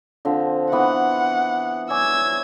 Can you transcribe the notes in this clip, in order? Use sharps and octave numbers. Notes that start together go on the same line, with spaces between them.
D3 F3 C4
E3 B3 F#5
C#5 D5 G#5 E6 G#6